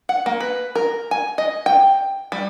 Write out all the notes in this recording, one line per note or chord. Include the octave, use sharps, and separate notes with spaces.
F#5
A#3
B4
A#4
G#5
D#5
G5
G3